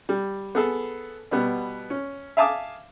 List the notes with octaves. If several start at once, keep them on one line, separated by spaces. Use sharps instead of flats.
G3
B3 G#4 A4
B2 G3 B3
C#4
E5 F5 G#5 A5 D6 D#6